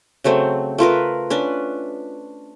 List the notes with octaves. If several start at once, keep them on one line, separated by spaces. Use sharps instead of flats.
C#3 F#3 A3 C4
A3 F4 A#4 B4
C#4 D4 B4